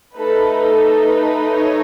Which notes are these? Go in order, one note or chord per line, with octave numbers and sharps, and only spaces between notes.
A3 D#4 A4 B4
A4
B4
C#5